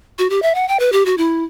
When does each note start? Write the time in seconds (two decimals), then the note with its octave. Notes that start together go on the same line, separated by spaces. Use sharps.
0.18 F#4
0.30 G4
0.42 E5
0.55 F#5
0.68 G5
0.79 B4
0.92 G4
1.05 F#4
1.17 E4